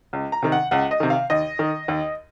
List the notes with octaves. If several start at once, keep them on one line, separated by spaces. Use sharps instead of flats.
C#2
A#5
C3 D#3
F#5
C#2 F#5
D#5
C3 D#3
F5
D#2 D#5
D#3
D#2